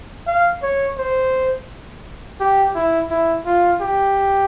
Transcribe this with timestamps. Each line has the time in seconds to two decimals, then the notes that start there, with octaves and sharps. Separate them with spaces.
0.27 F5
0.62 C#5
0.98 C5
2.40 G4
2.75 E4
3.10 E4
3.46 F4
3.81 G4